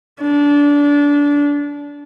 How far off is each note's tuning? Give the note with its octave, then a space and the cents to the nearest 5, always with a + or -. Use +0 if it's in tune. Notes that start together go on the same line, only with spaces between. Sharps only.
D4 -25